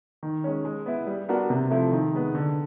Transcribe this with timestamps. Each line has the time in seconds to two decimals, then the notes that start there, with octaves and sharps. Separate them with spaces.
0.23 D#3
0.44 G#3 C#4
0.65 G#3
0.86 B3 E4
1.07 G3
1.29 B3 D4 F#4 A#4
1.50 C3
1.71 F3 A3 C4 E4
1.92 D#3
2.13 G#3 B3
2.35 D3